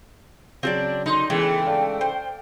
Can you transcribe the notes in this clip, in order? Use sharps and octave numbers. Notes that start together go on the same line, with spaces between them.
C#3 F#3 C4 D4 D5
D3 D#4 C6
C#3 E3 G#3 A3 B3 E4 G5
A4 D5 F5
C5